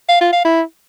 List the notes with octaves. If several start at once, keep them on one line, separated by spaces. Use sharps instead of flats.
F5
F4
F5
E4